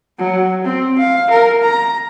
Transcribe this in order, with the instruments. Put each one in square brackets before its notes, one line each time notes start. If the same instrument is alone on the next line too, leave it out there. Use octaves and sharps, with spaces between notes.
[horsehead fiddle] F#3
C4
F5
A#4
A#5